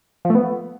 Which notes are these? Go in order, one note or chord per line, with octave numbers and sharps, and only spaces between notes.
F3
A3
B3